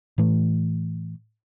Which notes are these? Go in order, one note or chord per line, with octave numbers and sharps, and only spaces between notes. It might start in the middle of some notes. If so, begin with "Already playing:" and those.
A2 E3 A3